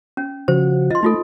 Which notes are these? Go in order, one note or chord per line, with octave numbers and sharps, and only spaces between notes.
C#4
C#3 F3 F#4 C5
F4 D#5 C6
A3 D#4 F4 A4